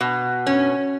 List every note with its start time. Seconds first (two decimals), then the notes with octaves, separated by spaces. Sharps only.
0.01 B2
0.47 C#4